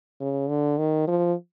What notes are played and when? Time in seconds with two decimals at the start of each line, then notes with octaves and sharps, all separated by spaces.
0.20 C#3
0.49 D3
0.78 D#3
1.07 F3